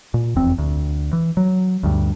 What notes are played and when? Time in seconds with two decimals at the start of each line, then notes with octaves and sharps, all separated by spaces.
0.14 A#2
0.36 F1 E2 C4
0.58 D2
1.13 E3
1.37 F#3
1.83 D2 G2